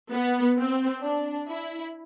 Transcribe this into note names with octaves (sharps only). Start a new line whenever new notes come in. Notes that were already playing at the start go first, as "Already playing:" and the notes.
B3
C4
D4
E4